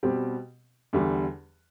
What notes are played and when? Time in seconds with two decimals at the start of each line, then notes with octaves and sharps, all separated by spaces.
0.03 B2 G3 C4 G4
0.93 E2 D3 G3